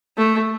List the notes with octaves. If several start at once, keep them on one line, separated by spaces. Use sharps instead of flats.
A3